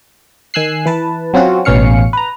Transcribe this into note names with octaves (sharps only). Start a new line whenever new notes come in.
D#3 G#5 E6 F#6 C7
E3 B4 A5
F#3 C4 C#4 F4 F#4
A1 B2 C#4 F5 C#7
B4 A#5